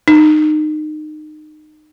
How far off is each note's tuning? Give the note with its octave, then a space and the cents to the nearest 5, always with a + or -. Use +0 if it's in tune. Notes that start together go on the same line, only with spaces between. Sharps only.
D#4 -25